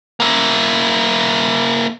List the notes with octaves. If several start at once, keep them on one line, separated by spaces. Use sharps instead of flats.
A#3 E4